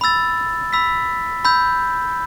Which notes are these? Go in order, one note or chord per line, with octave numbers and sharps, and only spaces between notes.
B5 E6 A6
B5 E6 B6
B5 E6 G6